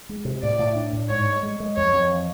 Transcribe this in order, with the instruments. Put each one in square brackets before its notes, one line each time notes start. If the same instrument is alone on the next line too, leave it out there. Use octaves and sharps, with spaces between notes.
[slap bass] G#3
C3
[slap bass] A2 [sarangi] D5
[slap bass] A2
D4
A2
[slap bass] G#2 [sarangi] C#5
[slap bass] G#3
G#3
G#3
[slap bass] F2 [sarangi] C#5
[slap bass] F2
E3